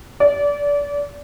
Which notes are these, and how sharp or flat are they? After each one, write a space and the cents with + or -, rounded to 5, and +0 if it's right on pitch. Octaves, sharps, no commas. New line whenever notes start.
D5 -30